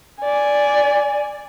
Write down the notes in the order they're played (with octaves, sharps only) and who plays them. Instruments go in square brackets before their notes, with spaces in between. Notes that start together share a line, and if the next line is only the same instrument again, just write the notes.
[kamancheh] D5 G#5